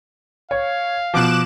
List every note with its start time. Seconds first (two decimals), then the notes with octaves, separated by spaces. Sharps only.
0.51 C#5 F5
1.14 B2 F3 D6 F#6 E7